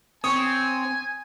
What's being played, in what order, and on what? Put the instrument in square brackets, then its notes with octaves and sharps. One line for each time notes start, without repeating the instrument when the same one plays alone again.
[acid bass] C4 [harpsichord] C#5 [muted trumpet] G#5 [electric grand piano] D#6